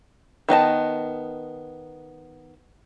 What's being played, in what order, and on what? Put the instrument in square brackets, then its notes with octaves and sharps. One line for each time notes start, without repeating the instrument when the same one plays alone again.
[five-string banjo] D#3 B3 D#5 A5